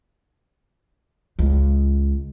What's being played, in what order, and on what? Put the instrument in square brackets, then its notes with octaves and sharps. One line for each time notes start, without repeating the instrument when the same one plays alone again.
[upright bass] C#2 G#3